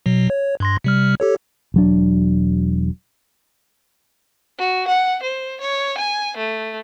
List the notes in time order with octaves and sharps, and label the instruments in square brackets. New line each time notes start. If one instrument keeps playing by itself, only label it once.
[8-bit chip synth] B2 F#3
C#5
G2 C6 A#6
C3 G3 F6
G4 A4 C#5
[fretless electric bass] E1 F#3 D4
[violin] F#4
F#5
C5
C#5
G#5
A3